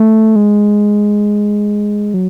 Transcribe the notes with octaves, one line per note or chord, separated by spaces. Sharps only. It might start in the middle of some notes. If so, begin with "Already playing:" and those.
Already playing: A3
G#3
F#3